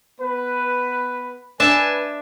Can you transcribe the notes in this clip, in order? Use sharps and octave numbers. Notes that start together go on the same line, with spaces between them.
B3 B4
D4 B4 E5 G#5 A5